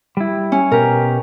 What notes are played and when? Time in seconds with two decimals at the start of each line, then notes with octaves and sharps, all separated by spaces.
0.17 G3 E4
0.52 C#4
0.72 B2 G4 A#4